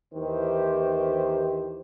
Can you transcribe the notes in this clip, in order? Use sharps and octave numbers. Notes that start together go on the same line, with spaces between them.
D#2 D#3 E3 G4 C5